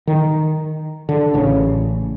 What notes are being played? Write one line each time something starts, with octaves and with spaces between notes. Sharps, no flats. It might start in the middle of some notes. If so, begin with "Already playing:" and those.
D#3
D3
A1 C#3